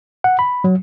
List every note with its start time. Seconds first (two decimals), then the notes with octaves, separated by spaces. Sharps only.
0.24 F#5
0.39 B5
0.64 F#3